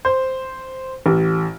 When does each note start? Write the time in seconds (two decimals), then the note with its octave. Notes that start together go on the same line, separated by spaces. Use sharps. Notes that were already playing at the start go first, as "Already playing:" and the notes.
0.05 C5
1.06 A1